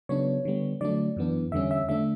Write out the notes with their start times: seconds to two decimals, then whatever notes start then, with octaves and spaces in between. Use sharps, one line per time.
0.09 C#3 F#3 B3 D4 C#5
0.45 D3 G3 B3
0.81 D3 F#3 A3 D4 D5
1.17 F#2 E3 B3 D4
1.52 E2 D3 G3 C#4 E5
1.71 E5
1.89 D3 A3 D4 E5